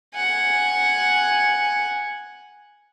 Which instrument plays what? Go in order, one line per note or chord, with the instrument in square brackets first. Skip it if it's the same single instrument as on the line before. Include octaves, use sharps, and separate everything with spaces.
[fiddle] F#5 G#5